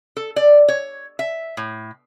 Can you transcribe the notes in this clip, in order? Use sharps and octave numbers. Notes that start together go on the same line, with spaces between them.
A4
D5
C#5
E5
A2